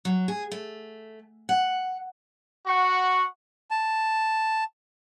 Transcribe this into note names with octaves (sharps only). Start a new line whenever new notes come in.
F#3
G#4
A3
F#5
F#4 F#5 C#6
A5